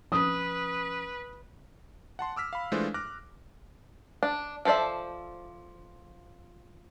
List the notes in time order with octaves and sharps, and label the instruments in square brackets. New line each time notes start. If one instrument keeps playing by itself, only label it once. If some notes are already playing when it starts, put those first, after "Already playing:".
[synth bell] F3 C#4 [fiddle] B4 [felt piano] D#6
[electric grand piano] F#5 A5 C6
D6 E6 F6 B6
F5 B5
E3 G#3 A3 D4 F4 C5
D6 F6 F#6 A#6
[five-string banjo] D4
F3 A4 C5 D5 E5